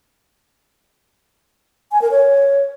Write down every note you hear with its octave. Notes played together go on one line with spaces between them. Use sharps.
G#5
A#4
C#5